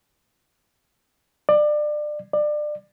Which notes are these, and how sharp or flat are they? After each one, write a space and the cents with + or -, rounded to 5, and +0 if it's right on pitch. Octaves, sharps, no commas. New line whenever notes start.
D5 +25
D5 +25